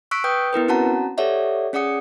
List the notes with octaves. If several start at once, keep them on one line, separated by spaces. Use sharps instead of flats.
C#6 E6 F#6 B6 D7
B4 G5 D#6 G6
B3 E4 A#4 B4
C4 C#4 F#4 F#5 A5 A#5
G4 A4 C#5 D5 E5 F#5
C#4 G#4 D5 F#5 D#6 C#7